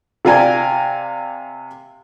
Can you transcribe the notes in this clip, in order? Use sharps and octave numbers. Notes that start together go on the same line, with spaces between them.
C3 D5 F5 G5 G#5 A#5